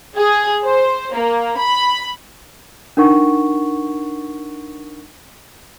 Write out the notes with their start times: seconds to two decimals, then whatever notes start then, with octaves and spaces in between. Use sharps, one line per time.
0.17 G#4
0.64 C5
1.14 A#3
1.58 B5
2.97 D4 D#4 A#4 F#5 C#6